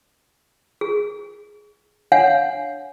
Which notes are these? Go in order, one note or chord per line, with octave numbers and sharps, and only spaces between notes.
G#4
D4 C#5 F5 F#5 G#5